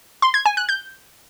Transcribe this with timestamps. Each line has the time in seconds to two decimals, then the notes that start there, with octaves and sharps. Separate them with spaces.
0.22 C6
0.34 G#6
0.46 G#5
0.57 F#6
0.69 G6